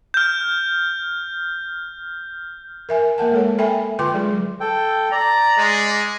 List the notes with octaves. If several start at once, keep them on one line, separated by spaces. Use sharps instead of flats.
F6 G6
A#4 E5 G#5
A#3 A#4 F#5 A5
G#3 A4 C#5
A4 E5 G5 G#5 B5
D3 F4 B4 G5 C6 D6
F#3 G#3 G#4 B4
A4 G5
D5 A#5
G#3